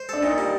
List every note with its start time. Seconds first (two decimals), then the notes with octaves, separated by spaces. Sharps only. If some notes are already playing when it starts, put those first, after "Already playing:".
Already playing: C5
0.09 D4 A4
0.23 A#2 D#4
0.38 G3